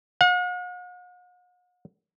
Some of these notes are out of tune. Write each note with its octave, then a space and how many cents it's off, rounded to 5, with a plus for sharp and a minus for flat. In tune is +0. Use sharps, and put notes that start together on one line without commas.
F#5 -45